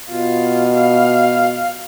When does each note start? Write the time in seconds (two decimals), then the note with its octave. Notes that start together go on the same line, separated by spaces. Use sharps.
0.10 B2 F4
0.77 F5